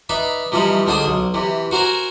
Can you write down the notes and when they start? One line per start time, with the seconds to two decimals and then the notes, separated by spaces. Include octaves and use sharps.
0.09 D#4 B4 D5 E5
0.52 C3 E3 F3 G3 D#4
0.87 C#2 D3 D4 C5 D#6
1.06 B1
1.34 C3 E3
1.71 F#4 A#4 C5 G#5 A#5